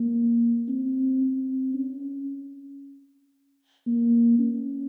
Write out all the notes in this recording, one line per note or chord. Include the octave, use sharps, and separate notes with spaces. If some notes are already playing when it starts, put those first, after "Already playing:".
Already playing: A#3
C4
C4
C#4
A#3
C#4